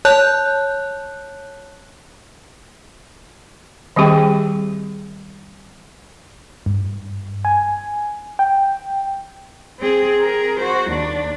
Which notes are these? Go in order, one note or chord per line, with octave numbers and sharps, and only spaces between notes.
C#5 A5 F#6 G6
D#3 G3 C4 G4 G#4 G5
G2
G#5
G5
C4 G#4
G#4 A#4
F#4 C5
D#2 D4